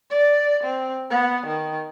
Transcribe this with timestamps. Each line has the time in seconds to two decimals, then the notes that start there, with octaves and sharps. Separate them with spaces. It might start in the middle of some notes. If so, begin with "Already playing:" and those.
0.10 D5
0.63 C4
1.10 B3
1.46 D#3